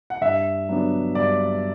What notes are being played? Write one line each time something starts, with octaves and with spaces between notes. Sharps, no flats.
F#5
G2 E5
F#3 B3 D4
G2 D5